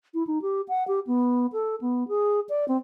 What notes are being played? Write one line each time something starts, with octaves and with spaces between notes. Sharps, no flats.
E4
D#4
G4
F#5
G4
B3
A4
B3
G#4
D5
C4